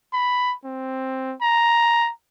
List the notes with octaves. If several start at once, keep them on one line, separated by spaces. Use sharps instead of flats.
B5
C4
A#5